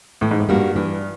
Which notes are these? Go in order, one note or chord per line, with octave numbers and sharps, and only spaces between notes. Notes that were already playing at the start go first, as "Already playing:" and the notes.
A2 E3
G#2
A2
G2 G3 A#3 D4 F#4
G2 E3